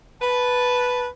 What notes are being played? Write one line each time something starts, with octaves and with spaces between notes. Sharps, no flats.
B4 A5